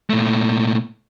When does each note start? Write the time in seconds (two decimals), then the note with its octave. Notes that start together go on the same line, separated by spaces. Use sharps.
0.10 A#2 A3